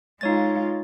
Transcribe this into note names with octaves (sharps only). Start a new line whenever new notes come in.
G#3 D#4 F4 C#5 A6